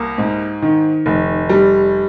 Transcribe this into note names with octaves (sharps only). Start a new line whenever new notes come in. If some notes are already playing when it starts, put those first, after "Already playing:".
Already playing: C2 A#3
G#2
D#3
F1
G3